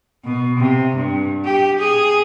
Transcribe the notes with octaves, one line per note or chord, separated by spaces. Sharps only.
B2
C3
G2
G4
G#4